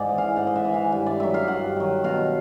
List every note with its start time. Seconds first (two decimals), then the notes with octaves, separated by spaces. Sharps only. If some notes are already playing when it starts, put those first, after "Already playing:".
Already playing: G#2 D5
0.09 E3
0.18 F5
0.36 G#2 F#5
0.47 D#5
0.56 E5
0.65 E3
0.74 F5
0.92 G2 E5
1.06 D5
1.20 D#3 F#3 E5
1.34 F5
1.48 G2 F#5
1.76 D#3 F#3
2.04 B2 F5